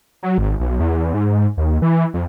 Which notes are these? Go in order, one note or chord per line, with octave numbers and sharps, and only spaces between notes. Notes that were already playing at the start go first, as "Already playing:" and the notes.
F#3
G#1
B1
E2
G#2
D#2
E3
F2